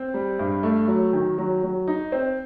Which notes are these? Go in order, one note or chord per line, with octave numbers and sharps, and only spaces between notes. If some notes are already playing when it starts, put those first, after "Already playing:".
Already playing: C4
G3
G2
A3
F#3
D#3
F#3
F#3
D#4
C4